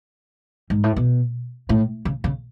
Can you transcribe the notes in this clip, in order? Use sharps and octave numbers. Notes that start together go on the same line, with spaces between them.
G#2
A2
B2
A2
C#3
C#3